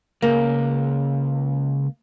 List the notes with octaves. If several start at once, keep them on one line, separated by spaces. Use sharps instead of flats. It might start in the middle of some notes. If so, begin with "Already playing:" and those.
C#2 A#3